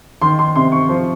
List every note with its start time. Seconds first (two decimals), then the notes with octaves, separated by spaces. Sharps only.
0.22 D#3 C6
0.39 C6
0.56 C3 C6
0.72 C#6
0.89 F3